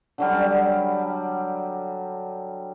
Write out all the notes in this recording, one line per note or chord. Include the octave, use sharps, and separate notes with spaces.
D3 F#3 G3